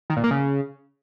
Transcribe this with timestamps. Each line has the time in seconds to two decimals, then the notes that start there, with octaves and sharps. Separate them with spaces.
0.10 D#3
0.17 A#2
0.24 A#3
0.31 C#3